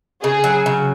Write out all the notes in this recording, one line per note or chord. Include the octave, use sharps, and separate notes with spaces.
C#3 G#4
F#3
C#3